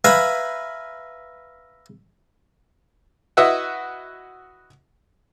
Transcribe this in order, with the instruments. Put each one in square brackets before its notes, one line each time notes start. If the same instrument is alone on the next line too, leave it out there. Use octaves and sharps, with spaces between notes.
[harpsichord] B4 E5 F5 G#5 A#5 B5
[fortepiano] E4 F#4 B4 D#5 E5 F#5